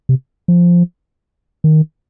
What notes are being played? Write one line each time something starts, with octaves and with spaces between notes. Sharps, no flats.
C3
F3
D#3